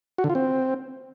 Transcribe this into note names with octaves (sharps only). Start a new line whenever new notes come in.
F#4
D3
F4
C4